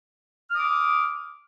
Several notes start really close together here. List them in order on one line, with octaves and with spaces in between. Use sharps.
F6 D#6 D6